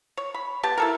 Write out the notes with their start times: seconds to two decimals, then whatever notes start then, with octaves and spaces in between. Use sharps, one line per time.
0.17 C#5
0.34 B5
0.63 B3 G4 A5
0.78 E4 A4 A#4